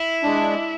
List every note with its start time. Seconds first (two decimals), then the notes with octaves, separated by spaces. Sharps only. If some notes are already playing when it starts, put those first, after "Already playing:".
Already playing: E4
0.24 G#3 D4